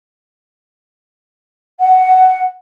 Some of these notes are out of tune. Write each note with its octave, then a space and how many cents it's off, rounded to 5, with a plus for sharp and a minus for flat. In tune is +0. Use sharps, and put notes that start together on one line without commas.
F#5 +10